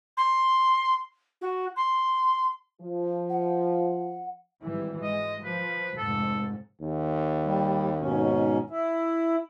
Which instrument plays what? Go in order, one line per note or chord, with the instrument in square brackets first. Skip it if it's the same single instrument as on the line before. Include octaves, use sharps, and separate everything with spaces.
[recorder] C6
F#4
C6
[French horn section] F3
[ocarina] F#5
[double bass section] G#1 E3 G3
[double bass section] G#3 [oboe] D#5
[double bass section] F3 [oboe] B4
[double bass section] F1 G#2 [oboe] A4
[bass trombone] D#2
[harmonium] G3
G#2 B2 C#4
E4